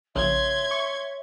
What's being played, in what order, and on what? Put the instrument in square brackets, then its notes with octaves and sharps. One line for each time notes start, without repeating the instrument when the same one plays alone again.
[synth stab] A#1 C#3 [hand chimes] C#5 [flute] E5 [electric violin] C6 G#6
[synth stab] C#6